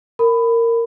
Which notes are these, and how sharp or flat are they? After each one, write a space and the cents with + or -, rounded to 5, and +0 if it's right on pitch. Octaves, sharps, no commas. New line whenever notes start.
A#4 -15 B5 +15